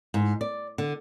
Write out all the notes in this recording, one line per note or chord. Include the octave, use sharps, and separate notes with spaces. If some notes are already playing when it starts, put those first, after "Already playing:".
G#2
D5
D3